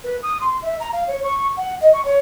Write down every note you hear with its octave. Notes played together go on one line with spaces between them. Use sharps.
B4
D#6
C6
E5
A#5
F5
C#5
C#6
F#5
D#5
C#6
C#5